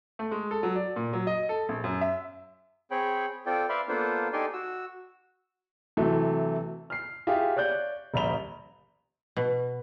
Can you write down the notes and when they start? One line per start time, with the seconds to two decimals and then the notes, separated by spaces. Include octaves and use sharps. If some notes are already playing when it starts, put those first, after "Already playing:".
0.19 A3
0.31 G#3
0.51 A4
0.63 F#3
0.76 D5
0.96 A#2
1.13 F#3
1.27 D#5
1.49 A4
1.69 A#1
1.84 F#2
2.01 E5
2.91 C4 G#4 C#5 G5 B5
3.46 C4 F4 A4 D5 G5
3.69 B4 D5 E5 F5 B5 C6
3.89 A#3 B3 D4 F4 A4 C5
4.33 D#4 G4 A4 D5 G#5 C6
4.53 F#4 E6
5.97 C3 E3 F#3 A3
6.90 F6 C7
7.27 F4 G4 G#4 E5 F5
7.56 C#5 D5 F#6 G6
8.14 D#1 A#1 B5 F7 G7
9.37 B2